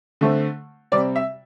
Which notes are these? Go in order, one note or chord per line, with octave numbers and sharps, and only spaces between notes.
D3 A3 C4
C3 G3 C4 D5
E5